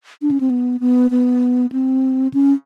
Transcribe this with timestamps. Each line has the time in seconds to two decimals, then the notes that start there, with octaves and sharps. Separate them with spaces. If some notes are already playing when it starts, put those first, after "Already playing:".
0.22 D4
0.31 C#4
0.40 C4
0.50 B3
0.80 B3
1.11 B3
1.72 C4
2.34 C#4